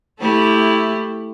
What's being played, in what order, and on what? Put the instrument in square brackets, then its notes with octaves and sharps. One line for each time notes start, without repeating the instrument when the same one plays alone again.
[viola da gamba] A3 E4 G4